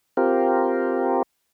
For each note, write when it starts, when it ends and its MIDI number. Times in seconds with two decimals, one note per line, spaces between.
0.17 1.22 60
0.17 1.22 65
0.17 1.22 67
0.17 1.22 70